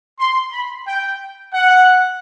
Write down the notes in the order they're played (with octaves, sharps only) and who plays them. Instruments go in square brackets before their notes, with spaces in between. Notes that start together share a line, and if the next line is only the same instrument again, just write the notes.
[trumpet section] C6
B5
G5
F#5